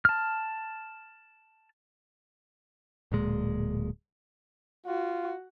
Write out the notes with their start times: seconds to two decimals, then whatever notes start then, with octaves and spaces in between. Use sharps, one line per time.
0.05 A5 F6
3.12 D1 A#2 G#3
4.86 F4 F#4